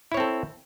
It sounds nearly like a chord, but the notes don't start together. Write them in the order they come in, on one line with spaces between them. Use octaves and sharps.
E4 C#5 C4 A4